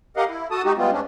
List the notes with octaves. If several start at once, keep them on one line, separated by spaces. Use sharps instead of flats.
G4 A#4 D#5 F5 F#5
E4
F#4 A4 A5 D#6
G#3 D#4 F#4 G4
G3 G#3 B3 C4 F4
G#2 C#4 D4